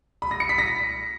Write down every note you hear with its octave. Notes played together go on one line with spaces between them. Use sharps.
B5
A#6
C#7
B6
A#6